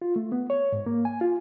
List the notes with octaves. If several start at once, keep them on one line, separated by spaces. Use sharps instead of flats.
F4
A3
B3
C#5
G#2
A#3
G#5
F4